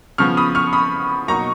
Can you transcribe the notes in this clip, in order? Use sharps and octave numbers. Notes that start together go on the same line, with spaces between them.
C#3 F3 B3 C#6 F6
B5 D#6
C#6 F6
B5 D#6
B2 F#3 A#3 D#4 A#5 C#6